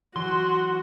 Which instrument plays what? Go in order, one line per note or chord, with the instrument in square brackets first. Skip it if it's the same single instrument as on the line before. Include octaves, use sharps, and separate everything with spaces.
[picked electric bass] E3 F#3 [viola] F#4 [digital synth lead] C6